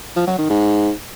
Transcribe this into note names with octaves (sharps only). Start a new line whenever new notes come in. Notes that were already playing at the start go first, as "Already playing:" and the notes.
F3
F#3
D#3
G#2